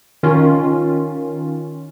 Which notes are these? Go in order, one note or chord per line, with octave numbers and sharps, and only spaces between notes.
D#3 C#4 F4